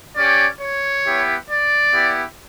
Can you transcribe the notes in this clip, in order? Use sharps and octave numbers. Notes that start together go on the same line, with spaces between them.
C#4 G4 D5
C#5
B3 E4 G4
D5
B3 E4 G4